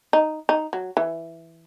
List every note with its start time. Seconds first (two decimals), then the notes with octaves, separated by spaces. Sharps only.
0.13 D#4
0.49 D#4
0.73 F#3
0.97 E3